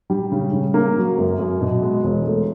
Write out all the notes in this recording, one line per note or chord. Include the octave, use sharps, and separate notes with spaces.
G3
C#3
C#3
A#3
F#3
F#2
F#2
B2
G#3
E1
A3